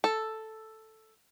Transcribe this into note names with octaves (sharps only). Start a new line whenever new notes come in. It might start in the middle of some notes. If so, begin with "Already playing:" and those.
A4